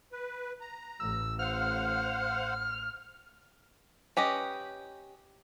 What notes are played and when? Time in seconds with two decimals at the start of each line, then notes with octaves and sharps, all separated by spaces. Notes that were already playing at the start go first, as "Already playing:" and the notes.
0.12 B4
0.61 A#5
1.00 A1 E6
1.39 C5 F5 F#5 F6
4.17 C#4 G4 B4 D#5